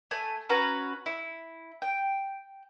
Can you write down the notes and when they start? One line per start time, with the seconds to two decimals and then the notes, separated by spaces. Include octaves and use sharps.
0.11 A3 G#5
0.49 C#4 F#4 B4 A#5
1.06 E4
1.82 G5